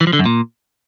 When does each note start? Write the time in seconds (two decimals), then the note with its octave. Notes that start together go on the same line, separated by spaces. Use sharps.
0.01 E3
0.07 F3
0.13 D3
0.19 F#2
0.26 A#2